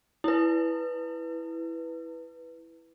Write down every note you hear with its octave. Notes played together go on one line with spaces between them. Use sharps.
E4 B4